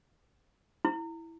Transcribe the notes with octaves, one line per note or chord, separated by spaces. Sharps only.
E4